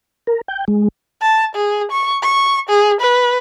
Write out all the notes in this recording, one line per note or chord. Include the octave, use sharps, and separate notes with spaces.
A#4
G5
G#3
A5
G#4
C#6
C#6
G#4
B4